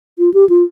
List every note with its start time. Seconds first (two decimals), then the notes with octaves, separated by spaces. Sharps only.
0.19 F4
0.34 G4
0.49 F4